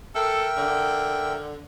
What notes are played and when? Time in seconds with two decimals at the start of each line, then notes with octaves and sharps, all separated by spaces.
0.15 A4 A#4 E5 G5
0.57 D3